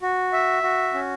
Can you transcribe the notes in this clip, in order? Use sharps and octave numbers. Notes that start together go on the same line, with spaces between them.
F#4
E5
F#4
C#4